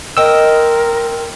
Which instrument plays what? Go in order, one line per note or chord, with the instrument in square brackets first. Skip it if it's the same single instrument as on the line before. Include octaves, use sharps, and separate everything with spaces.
[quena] A#4 [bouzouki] C5 D#5 [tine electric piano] G5 E6